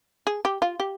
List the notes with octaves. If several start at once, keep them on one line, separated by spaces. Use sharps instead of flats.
G#4
G4
F4
G4